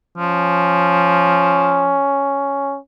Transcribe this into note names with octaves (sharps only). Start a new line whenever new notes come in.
F3 C#4